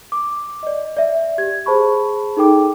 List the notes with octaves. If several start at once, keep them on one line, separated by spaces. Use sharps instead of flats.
D6
D5 D#5
D5 E5
G4 G#6
G#4 C5 A5 B5 C#6
D#4 G#4 A4 G5 D6